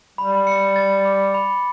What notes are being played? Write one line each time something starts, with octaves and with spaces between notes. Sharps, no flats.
G3 B5
C#7
A6
D6
B5